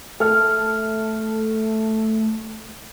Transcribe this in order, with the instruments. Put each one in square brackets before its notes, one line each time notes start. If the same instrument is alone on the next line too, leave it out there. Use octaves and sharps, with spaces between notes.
[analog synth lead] A3 [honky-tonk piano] A4 F6